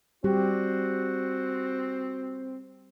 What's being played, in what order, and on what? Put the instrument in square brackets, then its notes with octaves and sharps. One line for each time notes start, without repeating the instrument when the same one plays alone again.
[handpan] G3 G4 [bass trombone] C4 [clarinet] F#4